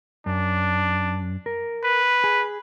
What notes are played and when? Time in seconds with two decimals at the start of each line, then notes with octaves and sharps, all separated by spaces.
0.26 F#2 D4
1.46 A#4
1.84 B4
2.24 G#4